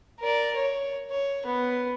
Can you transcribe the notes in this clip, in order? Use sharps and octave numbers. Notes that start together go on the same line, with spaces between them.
A#4 D5
C#5
C#5
B3